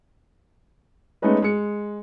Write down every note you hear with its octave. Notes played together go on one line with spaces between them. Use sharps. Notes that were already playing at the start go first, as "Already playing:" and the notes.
G#3 A3 B3 C#4 D#4 B4
G#3 C#7